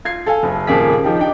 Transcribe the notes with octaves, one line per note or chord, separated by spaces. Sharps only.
F4 G#6 C7
A4 F5 G#5
F#1
D#1 F2 C#3 A#3 G#4 B6
F3 D#4 G4
D4 D#4 G5